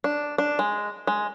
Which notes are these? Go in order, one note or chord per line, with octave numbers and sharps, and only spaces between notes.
D4
D4
G#3
G#3